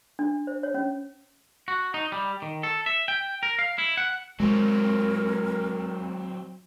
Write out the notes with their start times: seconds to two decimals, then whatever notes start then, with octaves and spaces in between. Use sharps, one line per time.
0.19 D4
0.47 C5
0.63 C#5
0.74 C#4
1.68 F#4
1.94 D#4
2.12 G3
2.42 D#3
2.63 A4
2.86 E5
3.08 G5
3.43 A#4
3.59 F5
3.78 E4
3.97 F#5
4.40 F#3 G#3 C4 A#4